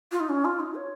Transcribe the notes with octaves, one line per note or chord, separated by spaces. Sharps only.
F4
D#4
C#4
F4
D#4
C#5